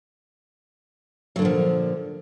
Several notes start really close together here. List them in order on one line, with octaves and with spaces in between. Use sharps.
F#3 D3 A#2 F3